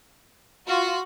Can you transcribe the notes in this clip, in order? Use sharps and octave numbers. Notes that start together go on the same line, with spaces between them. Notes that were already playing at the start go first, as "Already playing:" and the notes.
F4 F#4